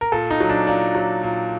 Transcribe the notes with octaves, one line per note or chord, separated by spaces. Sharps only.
A#4
A#2 A4
D#4
F#3
D4
A#2 D4
F#3
A#2